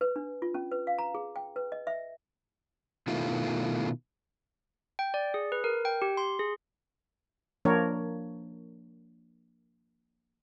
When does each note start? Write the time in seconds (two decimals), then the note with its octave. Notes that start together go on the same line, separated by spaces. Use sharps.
0.01 B4
0.16 D4
0.42 F4
0.54 C#4
0.71 B4
0.87 F5
0.98 A#5
1.15 G#4
1.36 G5
1.56 B4
1.72 D#5
1.87 E5
3.07 B2 D#3 A3 E4 F4
4.99 G5
5.14 D5
5.34 G#4
5.52 B4
5.64 A#4
5.85 G5
6.02 G4
6.17 C6
6.39 G#4
7.65 F3 A#3 D4 A#4 C#5